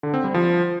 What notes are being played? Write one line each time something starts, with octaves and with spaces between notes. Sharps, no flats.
D3
C4
G3
F3